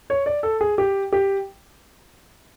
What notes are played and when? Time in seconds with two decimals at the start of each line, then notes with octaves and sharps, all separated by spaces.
0.10 C#5
0.26 D5
0.43 A4
0.61 G#4
0.78 G4
1.13 G4